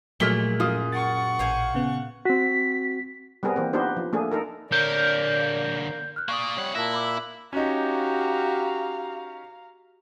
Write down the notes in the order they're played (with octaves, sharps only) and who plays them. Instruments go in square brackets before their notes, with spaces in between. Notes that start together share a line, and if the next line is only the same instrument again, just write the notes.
[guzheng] A#2 G#3 [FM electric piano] F3 F#3 A3 [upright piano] F6 B6 G7
[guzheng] F#2 [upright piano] F4 D#6
[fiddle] F#5 C#6 [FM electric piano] A6
[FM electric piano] A1 [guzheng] C5 F5 G#5
[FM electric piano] C#3 B3
[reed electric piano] C4 F#4 [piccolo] B6
[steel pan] G3 B3 C4 G#4 A#4
E3 A#3 C4
B3 D4 D#4 F4 G4 C5
F3
A3 A#3 D4 G#4
D#4 A4 A#4
[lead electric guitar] D3 C#5 [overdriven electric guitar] A#3 [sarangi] D5 [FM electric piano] G6
[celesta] F6 F#6
[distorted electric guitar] A#3 D5 [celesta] C#6 D#6
[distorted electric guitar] F2 F#5 [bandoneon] G3 C#5
[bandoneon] A#2 A#3 F#6 [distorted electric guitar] E4 [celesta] A5 A#6
[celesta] B5 D6 E6
[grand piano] C#4 D#4 [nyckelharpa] F#4 G4 [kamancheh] F5 A#5